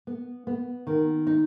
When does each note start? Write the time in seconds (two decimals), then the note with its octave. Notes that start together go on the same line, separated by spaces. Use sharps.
0.07 B3
0.47 B3
0.87 D#3
1.27 D#4